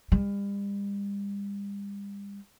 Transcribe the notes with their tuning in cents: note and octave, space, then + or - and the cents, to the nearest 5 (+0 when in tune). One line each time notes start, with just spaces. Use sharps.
G3 +40